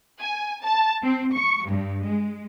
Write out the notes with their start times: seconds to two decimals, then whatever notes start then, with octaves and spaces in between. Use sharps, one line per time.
0.20 G#5
0.63 A5
1.03 C4
1.34 C#6
1.67 G2
2.04 G#3